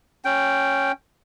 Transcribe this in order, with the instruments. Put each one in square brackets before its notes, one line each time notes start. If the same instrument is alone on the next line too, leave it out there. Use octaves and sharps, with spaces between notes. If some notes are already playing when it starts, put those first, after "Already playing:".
[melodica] C#4 G5